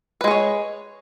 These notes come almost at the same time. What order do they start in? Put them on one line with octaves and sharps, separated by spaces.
B4 G#3 G#4 C#5